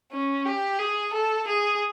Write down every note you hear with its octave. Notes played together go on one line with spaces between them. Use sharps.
C#4
G4
G#4
A4
G#4